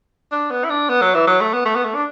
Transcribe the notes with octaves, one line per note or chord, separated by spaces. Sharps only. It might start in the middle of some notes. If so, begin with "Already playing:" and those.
D4
B3
E4
D4
B3
F#3
E3
F#3
A3
B3
A3
B3
A3
D4